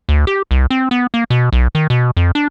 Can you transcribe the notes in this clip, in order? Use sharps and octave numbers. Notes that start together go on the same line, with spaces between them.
D2
G4
C2
C4
B3
A#3
B2
B1
D#3
B2
F2
D4